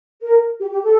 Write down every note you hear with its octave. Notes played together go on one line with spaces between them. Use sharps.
A#4
G4
G4
A4